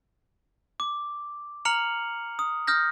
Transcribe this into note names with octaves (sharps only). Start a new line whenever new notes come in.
D6
A#5 F6 C#7 F7 F#7
D#6
D#6 F6 G6 A#6